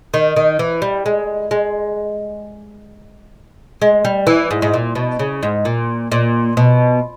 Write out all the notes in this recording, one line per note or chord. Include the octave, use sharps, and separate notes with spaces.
D#3
D#3
E3
G3
G#3
G#3
G#3
G3
E3
G#2
G#2
A#2
B2
C#3
G#2
A#2
A#2
B2